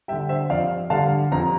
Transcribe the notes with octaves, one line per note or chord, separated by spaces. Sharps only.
D3 G3 E5 G5
C5 E5
F2 D5 F5
D3 G3 F5 A5
F2 A#5